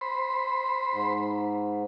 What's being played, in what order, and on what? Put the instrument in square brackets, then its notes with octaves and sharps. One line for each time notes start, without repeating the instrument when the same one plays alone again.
[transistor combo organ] C5 B5
[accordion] G#2